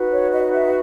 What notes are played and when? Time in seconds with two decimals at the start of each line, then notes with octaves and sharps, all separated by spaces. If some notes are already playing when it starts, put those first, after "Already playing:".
Already playing: D#4 F#4 B4
0.12 C#5
0.33 D#5
0.44 D#5
0.53 E5